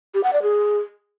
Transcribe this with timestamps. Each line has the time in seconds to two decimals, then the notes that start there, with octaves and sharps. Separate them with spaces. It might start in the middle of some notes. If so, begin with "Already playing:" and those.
0.14 G4
0.24 F#5
0.33 D5
0.42 G#4